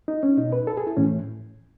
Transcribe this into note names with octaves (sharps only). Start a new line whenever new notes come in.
D#4
C#4
B2 D#4
B4
A4
G#4
E4
A2 E3 C#4